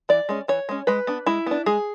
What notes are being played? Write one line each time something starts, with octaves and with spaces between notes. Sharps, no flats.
E3 D5
G#3 C#4
E3 C#5
G#3 C#4
G#3 B4
B3 D4
G#3 E4
B3 D4
G#3 G#4